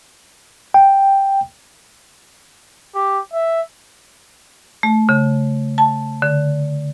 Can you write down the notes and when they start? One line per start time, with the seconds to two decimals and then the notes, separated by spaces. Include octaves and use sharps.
0.74 G5
2.95 G4
3.33 E5
4.83 A3
5.09 C#3
5.78 A5
6.22 D3